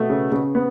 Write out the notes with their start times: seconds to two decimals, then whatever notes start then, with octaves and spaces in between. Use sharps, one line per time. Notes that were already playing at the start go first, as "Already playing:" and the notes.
Already playing: B2 A3
0.10 C#3
0.32 C#3
0.55 B3